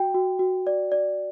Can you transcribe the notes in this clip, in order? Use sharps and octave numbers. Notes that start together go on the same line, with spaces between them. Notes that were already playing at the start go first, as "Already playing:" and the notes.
Already playing: F#4 G5
F#4
F#4
D5
D5